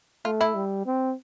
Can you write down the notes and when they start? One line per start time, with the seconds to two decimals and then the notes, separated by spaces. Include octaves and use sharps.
0.25 A3 F4
0.41 E4
0.55 G3
0.86 C4